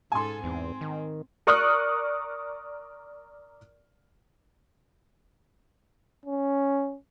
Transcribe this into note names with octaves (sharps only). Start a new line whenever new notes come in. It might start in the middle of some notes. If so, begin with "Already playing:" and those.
G#2 A4 G#5 C6
E2 C4
D#3
A#4 D5 C#6 D#6 F6 F#6
C#4